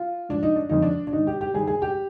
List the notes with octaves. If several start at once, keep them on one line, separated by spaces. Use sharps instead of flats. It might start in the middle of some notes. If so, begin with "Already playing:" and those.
Already playing: F4
G#2 F3 D4
D#4
D4
F2 D#3 D#4
D4
D4
G#2 D#3 D#4
G4
G4
G2 D#3 G#4
G#4
G4